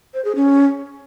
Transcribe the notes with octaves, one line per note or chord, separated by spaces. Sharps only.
C5
G#4
C#4